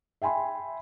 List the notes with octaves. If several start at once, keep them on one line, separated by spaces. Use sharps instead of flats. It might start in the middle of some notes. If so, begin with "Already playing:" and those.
E5 G5 G#5 B5 C6